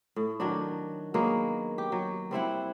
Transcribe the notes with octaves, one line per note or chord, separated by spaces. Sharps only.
A2
D#3 F#3 D4
F#3 G#3 A#3 B3
G4
F#3
G3 C4 E4 F#5